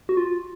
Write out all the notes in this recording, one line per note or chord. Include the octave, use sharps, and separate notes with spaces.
F#4
F4